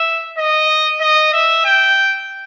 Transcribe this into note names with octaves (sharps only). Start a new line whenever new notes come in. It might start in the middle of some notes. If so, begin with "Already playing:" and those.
Already playing: E5
D#5
D#5
E5
G5